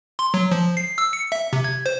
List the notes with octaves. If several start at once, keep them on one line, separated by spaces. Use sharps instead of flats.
C6
F#3
F3
C7
E6
C#7
E5
C3
G#6
C5